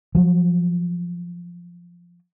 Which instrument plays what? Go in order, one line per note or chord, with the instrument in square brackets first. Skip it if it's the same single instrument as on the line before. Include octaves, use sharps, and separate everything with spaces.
[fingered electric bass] F3 F#3